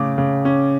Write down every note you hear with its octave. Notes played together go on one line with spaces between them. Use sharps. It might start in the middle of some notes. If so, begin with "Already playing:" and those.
Already playing: A2 C#3 D6
C#3
C#4